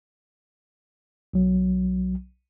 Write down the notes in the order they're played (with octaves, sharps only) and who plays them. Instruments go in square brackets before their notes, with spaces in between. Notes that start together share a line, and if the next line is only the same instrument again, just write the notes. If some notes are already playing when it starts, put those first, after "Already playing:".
[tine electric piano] B1 F#3